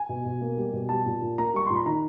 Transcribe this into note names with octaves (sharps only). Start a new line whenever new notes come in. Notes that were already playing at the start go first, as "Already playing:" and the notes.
Already playing: G#5
B2
B2
A#3
G3
B2
G3 A5
A#2
A#2
A#3 A#5
G3 C#6
A#2 C6
B5
D#3 A#5